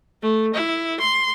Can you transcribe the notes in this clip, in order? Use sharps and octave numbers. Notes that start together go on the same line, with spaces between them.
A3
E4
C6